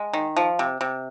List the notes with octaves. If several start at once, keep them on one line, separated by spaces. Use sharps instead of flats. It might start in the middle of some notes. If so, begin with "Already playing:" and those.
Already playing: G#3
D#3
F3
C3
C3